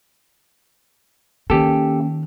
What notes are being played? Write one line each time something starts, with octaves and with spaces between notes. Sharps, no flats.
D#3 A#3 C#4 G4 A4